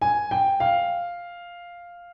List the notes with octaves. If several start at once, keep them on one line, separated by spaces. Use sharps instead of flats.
G#5
G5
F5